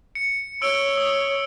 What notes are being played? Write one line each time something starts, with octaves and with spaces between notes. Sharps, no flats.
C#7
C#5 E6 D7 G7
D#6